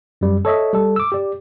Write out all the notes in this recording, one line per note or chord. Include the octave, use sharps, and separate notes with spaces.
F#2 G3
A4 C#5 D#5 E5
G3 A4
D6 E6
G4 D5